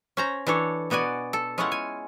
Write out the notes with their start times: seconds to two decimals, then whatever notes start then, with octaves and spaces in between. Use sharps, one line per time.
0.17 C#4 C5 A#5
0.47 E3 D4 A4 C#5
0.90 B2 B3 F#4 D5 G#5
1.33 A4
1.58 G#3 C#4 E4 F4 C#5 F#5
1.72 G#5